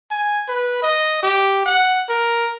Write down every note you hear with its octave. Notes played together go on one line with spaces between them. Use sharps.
G#5
B4
D#5
G4
F#5
A#4